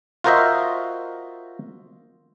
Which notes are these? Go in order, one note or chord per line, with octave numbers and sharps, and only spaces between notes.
F4 F#4 A#4 C5 D#5 E5